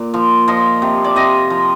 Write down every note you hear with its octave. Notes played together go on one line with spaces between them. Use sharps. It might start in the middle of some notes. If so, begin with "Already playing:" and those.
Already playing: A#2 D5
F3
F3 D#5
C3
D5
C3 D#5
F3